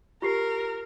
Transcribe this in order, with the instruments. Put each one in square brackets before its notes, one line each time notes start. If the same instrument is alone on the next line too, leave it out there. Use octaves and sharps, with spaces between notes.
[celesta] F4 G4 C7 [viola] A#4